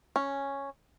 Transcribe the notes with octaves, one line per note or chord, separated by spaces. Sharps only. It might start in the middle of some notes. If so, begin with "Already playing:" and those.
C#4